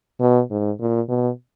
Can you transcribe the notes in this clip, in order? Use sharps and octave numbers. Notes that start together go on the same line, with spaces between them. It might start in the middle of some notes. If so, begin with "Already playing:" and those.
B2
G#2
A#2
B2